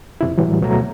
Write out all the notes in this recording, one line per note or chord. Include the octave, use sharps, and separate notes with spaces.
F2 C3 E4
A2 E3 F#3 G3
D2 B2 F#3 A3 A#5